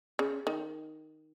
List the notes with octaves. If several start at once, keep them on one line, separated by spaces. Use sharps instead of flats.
C#3
D#3